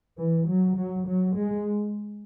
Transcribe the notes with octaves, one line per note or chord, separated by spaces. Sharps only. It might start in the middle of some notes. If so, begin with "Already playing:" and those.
E3
F#3
F#3
F#3
G#3